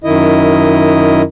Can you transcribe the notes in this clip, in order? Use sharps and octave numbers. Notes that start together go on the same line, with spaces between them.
F#2 D#3 E4 D#5